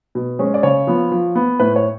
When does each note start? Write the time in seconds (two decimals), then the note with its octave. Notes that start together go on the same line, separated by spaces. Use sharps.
0.15 B2
0.39 G#3 C#4
0.54 D5
0.63 C#3 C#5
0.87 F3 B3
1.11 F3
1.35 B3
1.60 A2 B4
1.76 C#5